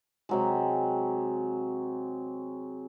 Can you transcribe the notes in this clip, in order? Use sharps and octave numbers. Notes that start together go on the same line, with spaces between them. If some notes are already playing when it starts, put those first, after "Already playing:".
C3 F#3 G#3